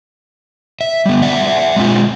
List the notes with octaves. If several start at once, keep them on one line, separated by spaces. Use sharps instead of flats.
E5
G3 B3
D5 E5 F#5
G#3 C4 F4